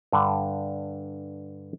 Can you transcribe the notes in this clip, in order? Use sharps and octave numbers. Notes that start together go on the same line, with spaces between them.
G2 D3